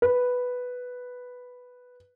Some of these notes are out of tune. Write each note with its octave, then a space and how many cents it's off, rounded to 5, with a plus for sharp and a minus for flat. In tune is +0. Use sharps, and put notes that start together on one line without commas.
B4 +0